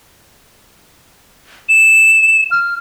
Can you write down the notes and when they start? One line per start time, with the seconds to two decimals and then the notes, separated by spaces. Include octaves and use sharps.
1.69 E7
2.51 F6